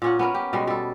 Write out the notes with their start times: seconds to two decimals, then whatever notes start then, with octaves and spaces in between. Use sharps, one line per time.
0.02 A#2 C#4 F#5
0.19 B3 C#4 A#4
0.34 G4
0.53 B2 G3 G#3
0.67 G3 A4